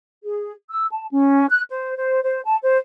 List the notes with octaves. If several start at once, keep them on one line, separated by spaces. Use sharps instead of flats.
G#4
E6
A5
C#4
F#6
C5
C5
C5
A5
C5